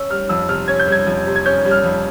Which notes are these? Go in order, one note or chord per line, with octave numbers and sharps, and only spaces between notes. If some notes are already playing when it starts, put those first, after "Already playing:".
Already playing: C#4 E6
G3 F6
F2 E6
C3 F6
C#4 G#6
G6
G3 G#6
F2
C3
G#6
C#4 G6
G3
F6
F2